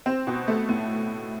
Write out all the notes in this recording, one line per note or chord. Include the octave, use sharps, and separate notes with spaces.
C4
B2
A3
A2